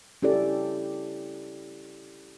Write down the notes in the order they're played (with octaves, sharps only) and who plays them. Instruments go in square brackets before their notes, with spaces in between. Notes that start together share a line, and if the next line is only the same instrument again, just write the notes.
[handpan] C#4 E4 G4 A4 D5